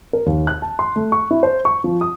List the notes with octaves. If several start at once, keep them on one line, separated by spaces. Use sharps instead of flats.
A#4
D#2
F#6
A5
C6
A3
C#6
E4
C5
C#6
F3
D#6